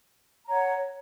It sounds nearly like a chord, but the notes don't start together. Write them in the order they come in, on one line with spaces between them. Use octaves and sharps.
A#5 C#5 F#5